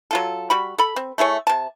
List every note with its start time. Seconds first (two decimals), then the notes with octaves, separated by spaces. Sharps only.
0.11 F#3 F4 A4
0.50 G3 F#4 B5
0.78 A4 B5
0.96 C4
1.18 A3 E4 G#4 C#5
1.47 C3 A5